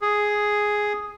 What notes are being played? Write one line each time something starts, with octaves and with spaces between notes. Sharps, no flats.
G#4